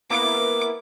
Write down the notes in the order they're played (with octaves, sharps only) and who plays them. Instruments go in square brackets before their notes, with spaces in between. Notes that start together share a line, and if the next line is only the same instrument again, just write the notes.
[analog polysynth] A#3 B3 E4 [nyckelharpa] D6